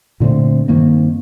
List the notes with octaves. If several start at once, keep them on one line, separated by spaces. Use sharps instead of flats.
A#2 D3 A3 C4
G2 D#3 A#3 C4